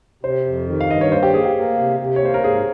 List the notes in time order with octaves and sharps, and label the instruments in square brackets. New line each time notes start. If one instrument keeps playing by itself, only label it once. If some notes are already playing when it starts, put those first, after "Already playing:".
[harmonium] C3 [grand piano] C5
[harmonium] F2
D#3
[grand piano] F5
[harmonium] G2 [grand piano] D#5
[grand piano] C#5
[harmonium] A#3 [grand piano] C5
[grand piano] G4
[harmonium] A#3 [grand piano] G#4
[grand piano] G4
[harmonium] A#3
C3
C3
[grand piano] C#5
[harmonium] A#3 [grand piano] C5
[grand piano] A#4
[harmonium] G#2 [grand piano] G#4